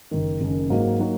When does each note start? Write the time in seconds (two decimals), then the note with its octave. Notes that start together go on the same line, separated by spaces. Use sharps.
0.11 F#1 F#2 D#3
0.41 F#1 F#2 D#3
0.69 G#2 F#3 A#3 D#4 F#4
0.99 F#3 A#3 D#4 F#4